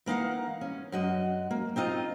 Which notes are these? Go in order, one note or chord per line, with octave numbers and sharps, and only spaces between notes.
E3 A#3 D#4 F5 F#5
C#4
F#2 F#4 D#5
A#3
C4 D#4 F4 D#5